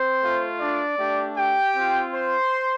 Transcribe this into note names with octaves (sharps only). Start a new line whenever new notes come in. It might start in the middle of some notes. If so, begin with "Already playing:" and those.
Already playing: C4 C5
A3 F4
D4 D5
A3 D4 G4
G4 G5
C4 F4
C5 C6